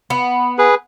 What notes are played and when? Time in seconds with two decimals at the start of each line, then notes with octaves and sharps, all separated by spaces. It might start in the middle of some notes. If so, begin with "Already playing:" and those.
0.10 B3
0.58 G#4 B4